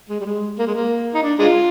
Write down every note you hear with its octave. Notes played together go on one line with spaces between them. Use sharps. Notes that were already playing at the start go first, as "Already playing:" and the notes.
G#3
G3
G#3
A#3
G#3
A#3
D#4
D4
G#3 D4 F4